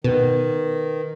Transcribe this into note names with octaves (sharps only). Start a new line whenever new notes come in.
B2 D#3 B4